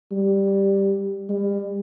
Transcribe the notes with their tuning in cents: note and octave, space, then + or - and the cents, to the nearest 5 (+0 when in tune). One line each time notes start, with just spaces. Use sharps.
G3 +0
G3 +35